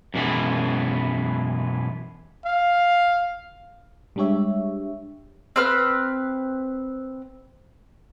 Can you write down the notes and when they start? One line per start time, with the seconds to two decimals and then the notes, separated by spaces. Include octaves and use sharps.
0.14 F#2 B2 E3 G#3 B3
2.45 F5
4.16 G3 G#3 D4 G4 C#5 E5
5.56 C4 B4 F6